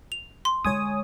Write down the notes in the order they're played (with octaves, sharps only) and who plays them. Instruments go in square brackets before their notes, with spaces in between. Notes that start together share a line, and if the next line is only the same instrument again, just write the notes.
[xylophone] F7
C6
[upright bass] D3 G#3 [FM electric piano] C#5 G#5 D#6